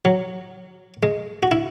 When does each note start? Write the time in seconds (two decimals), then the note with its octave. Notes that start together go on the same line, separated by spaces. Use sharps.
0.05 F#3
1.03 G#3
1.43 F#4
1.51 E4